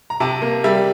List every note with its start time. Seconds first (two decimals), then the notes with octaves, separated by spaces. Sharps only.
0.10 A#5
0.20 C3 A5
0.42 A#3
0.64 G3 E5